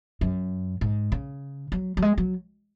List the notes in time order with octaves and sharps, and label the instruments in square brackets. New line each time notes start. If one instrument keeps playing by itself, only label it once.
[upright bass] F#2
G#2
C#3
F#3
F#3
G#3
F#3